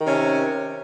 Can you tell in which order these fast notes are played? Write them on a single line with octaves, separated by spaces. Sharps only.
D#3 C3 C#4